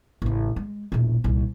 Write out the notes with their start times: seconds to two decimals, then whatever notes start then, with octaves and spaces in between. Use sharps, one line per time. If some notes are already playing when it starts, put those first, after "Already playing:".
0.22 A1 C#3
0.56 G#3
0.92 E1 A#1
1.24 D#1 C2